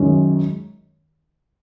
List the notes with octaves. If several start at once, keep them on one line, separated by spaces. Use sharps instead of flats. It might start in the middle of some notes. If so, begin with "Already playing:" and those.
Already playing: F#2 D#3 G#3 C#4